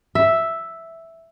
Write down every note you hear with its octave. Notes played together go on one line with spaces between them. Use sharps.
E5